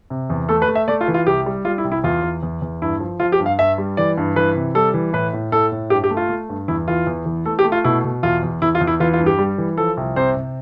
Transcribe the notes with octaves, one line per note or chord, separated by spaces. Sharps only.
C3
E2
A3 A4
B4
A3
E5
A3 D5
F4
E3
F4
C2 G4
G3
G3 F4
E4
C2
E4
E2 F4
E2
E2
E2
G2 E4
F3
F3 F4
G4
G2
F5
G2 E5
G3
E3 D5
G2
E3 B4
C3
G3 A4
E3
A2 B4
A2
A2 A4
A2
G2 G4
G4
A3
F4
A3
G2
E2 E4
E3 F4
E2
E3
A3 A4
G4
A3
F4
B2 E4
B2
E2 F4
E2
E2 E4
F4
E2
E4
E3 F4
F4
G2
G4
G3
E3
F3 A4
C2
C3 C5
C3